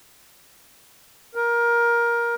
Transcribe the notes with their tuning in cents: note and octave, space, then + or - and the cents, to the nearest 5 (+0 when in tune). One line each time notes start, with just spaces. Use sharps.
A#4 +15